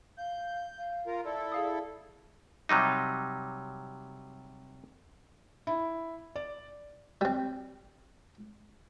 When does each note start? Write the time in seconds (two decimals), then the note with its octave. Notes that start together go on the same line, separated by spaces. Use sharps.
0.18 F5 G6
0.78 F5
1.07 F4 A#4
1.25 E4 A4 D5
1.52 G#4 F5 D#6
2.69 C3 F#3 G3 D#4
5.67 E4
6.36 D5
7.21 G3 C4